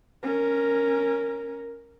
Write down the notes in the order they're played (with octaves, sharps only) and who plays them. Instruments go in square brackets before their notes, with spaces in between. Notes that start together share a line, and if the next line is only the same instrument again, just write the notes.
[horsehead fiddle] C#4 A#4